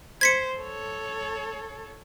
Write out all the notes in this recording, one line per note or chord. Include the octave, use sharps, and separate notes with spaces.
C5 G#6 B6 C#7
A4 C#5